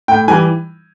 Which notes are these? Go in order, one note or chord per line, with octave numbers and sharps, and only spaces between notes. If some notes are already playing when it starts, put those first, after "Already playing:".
A2 G5
E3 G3 G#5